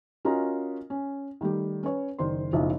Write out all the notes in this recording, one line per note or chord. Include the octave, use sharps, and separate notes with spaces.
C#4 F4 F#4 A#4 D#5 A#5
C#4
D#3 G3 A3 G4
C#4 B4 C#5
F#1 D#3 C5 D5 C6
F#1 B1 F3 D#5 E5